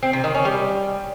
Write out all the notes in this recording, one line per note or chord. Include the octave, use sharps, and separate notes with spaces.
C4
C3
D#3
C#4
G3